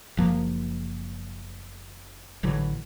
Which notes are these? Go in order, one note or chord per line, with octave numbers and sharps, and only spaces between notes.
F#1 F3 A#3
A1 D3 E3 F#3